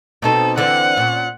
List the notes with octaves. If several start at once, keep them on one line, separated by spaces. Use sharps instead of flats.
B2 C4 D#4 A4
D3 E3 C4 F#5
A#2 C#4